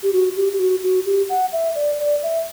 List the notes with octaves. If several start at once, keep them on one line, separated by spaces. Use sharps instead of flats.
G4
F#4
G4
G4
F#4
F#4
G4
F#5
E5
D5
D5
E5